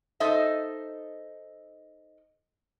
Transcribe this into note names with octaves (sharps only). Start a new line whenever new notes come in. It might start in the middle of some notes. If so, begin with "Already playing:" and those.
D#4 A4 C5 D#5 E5